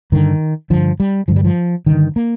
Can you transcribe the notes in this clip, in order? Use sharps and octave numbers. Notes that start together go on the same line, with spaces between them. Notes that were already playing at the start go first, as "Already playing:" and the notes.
G2 D3 D#3
G2 D3 F3
G3
G2 D3 F3
G3
F3
G2 D3 D#3
A#3